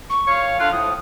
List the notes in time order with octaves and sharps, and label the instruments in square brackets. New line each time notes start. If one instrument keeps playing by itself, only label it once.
[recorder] C#6
[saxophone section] A#2 C#5 F5
[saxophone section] D3 F4 F5 [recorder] F#6
[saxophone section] A2 F3 [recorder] D#6